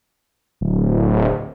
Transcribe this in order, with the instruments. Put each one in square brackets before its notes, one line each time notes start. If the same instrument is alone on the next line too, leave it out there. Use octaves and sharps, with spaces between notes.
[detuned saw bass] D1